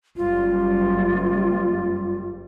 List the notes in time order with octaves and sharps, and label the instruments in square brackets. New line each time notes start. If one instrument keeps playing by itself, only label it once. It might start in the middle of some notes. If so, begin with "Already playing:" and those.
[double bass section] F#1 G3 [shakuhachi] F4